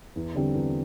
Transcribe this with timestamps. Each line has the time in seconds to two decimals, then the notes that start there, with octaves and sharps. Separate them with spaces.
0.16 E2
0.35 D3 G3 C4 G4
0.54 E2